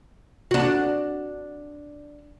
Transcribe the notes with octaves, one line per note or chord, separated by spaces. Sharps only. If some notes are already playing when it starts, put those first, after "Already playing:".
D4 F#4